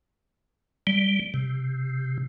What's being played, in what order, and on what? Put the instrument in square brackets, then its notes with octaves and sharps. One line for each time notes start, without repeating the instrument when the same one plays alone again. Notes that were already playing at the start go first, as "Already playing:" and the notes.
[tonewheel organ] G3
C3